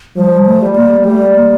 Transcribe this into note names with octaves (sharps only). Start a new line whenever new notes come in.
F3 G3
A3
G3
A#3
G3 A3
A#3